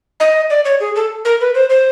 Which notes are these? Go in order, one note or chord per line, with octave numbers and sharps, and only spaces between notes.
D#5
D5
C#5
G#4
A4
A#4
B4
C5
C5